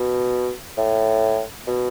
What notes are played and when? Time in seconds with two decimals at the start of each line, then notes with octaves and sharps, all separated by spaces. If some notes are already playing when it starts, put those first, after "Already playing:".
Already playing: B2
0.78 A2
1.67 B2